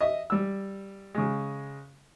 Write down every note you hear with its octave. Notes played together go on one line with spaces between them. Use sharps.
D#5 E5
G3 E6
C#3 G#3